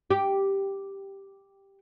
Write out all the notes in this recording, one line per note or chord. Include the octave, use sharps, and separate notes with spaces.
G4